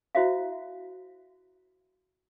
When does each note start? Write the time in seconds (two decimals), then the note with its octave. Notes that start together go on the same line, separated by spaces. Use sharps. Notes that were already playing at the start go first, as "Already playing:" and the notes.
0.15 E4 F#4 C5 E5 F5